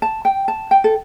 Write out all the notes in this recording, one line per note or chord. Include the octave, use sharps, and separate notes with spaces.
A5
G5
A5
G5
A4